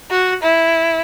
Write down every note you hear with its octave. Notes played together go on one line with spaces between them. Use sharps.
F#4
E4